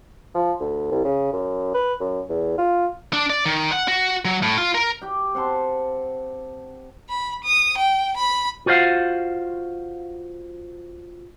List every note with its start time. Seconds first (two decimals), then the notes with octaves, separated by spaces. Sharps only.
0.34 F3
0.60 D2
0.91 C2
1.04 C#3
1.33 F#2
1.74 B4
2.00 F#2
2.29 E2
2.58 F4
3.13 D4
3.30 D5
3.46 D#3
3.72 F#5
3.88 F#4
4.25 F#3
4.43 A2
4.58 F4
4.75 A#4
5.02 G4 G5
5.35 C4 F#5 A5 C6
7.09 B5
7.44 D#6
7.78 G5
8.17 B5
8.66 F4 F#4 C5 C#5 F5 F#5